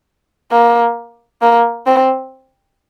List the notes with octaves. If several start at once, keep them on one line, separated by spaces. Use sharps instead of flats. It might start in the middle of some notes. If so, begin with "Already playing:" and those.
A#3
A#3
C4